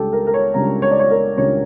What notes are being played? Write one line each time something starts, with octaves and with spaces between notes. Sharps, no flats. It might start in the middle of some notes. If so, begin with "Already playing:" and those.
Already playing: C#2 C#3 G3 D4 G4 A4
A#4
A#4
C#5
C#2 C#3 G3 D4 A#5
C#5
D5
C#5
A#4
C#2 C#3 G3 D4 C#5